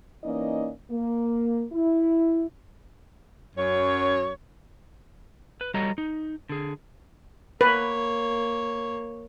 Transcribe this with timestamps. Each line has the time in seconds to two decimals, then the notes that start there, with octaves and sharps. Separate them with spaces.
0.24 E3 A#3 C#4 D#4 D5 D#5
0.91 A#3
1.73 E4
3.56 F#2 C#5
5.61 B4
5.74 G3 F#4 A4 C#5 D#5 A#5
5.98 D#4
6.49 D3 G#4
7.61 A#3 B4 C#5